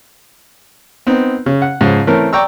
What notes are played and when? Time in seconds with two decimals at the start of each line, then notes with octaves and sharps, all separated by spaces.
1.07 B3 C4 D#4
1.46 C#3
1.62 F#5
1.81 G#2 C#3 F3
2.07 E3 A3 C4 C#4 A#4
2.33 D5 G5 A#5 C#6 E6